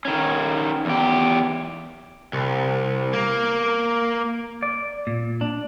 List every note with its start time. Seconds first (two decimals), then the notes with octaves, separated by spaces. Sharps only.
0.05 D#3 C#4
0.85 E2 G4
2.33 C2
3.13 A#3
4.62 D5
5.07 A#2
5.41 D4